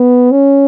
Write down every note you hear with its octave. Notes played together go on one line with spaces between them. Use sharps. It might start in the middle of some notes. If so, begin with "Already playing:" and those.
Already playing: B3
C#4